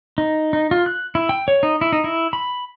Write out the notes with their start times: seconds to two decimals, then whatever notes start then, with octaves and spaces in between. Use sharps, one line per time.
0.18 D#4
0.53 D#4
0.71 F4
0.86 F#6
1.15 E4
1.29 G5
1.48 C#5
1.63 D#4
1.81 E4
1.93 D#4
2.04 E4
2.33 B5